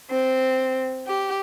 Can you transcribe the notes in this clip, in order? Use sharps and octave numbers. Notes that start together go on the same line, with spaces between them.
C4
G4